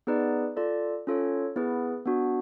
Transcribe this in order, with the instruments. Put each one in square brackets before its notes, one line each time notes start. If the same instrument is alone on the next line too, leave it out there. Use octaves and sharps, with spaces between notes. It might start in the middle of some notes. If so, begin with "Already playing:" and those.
[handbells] B3 D#4 G#4 B4 D5
F4 A4 D5
C#4 F4 A4 C#5
B3 E4 G#4 B4
B3 D4 F#4